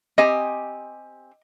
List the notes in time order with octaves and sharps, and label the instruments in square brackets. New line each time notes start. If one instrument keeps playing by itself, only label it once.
[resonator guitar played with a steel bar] C4 G4 G#5 [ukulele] D#5